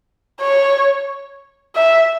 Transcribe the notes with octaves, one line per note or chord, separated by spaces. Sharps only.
C#5
E5